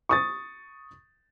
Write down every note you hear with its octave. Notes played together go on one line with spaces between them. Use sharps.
C#6 D#6 A6